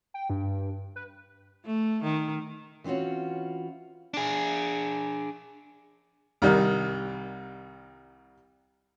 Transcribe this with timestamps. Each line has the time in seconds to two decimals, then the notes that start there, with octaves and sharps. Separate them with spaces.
0.14 G5
0.30 G2
0.96 B4
1.65 A3
2.03 D#3
2.84 E3 C4 C#4 F4 F#4
4.14 D4 G#4
6.42 C2 D#3 G3